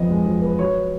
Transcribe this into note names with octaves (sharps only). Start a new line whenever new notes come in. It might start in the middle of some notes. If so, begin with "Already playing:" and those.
Already playing: F2 F3 B3 D#5
G#3
F3
B3
F#3 C#5